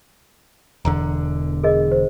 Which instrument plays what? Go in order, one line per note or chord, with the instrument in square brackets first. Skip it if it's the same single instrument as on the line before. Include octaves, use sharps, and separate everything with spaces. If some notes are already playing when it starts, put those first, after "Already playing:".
[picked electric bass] E1 E2 D3 [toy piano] A#5
[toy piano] G#4 A#4 D#5
C5